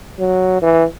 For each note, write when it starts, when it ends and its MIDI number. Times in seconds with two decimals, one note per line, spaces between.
0.19 0.61 54
0.62 0.84 52